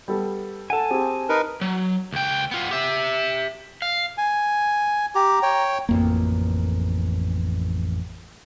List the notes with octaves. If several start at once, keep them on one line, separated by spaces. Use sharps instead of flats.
G3 B3 A4
A4 F#5 G#5 A5
C4 G4 G#4
D#4 A#4 B4
F#3
C#2 G5
B3 F4
G4 E5
F5
G#5
G4 A#5
C#5 G5
A1 F2 A#3